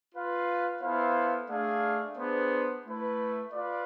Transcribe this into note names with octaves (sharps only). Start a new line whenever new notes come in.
F4 B4 F5
B3 E4 A4 C5 F5
A3 D4 G#4 D5 F5
B3 D4 G#4 C5
A3 E4 B4
F4 B4 D5